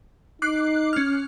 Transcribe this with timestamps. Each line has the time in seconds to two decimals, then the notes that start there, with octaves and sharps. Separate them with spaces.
0.42 D#4 D6 F#6 C7
0.93 C#4 F6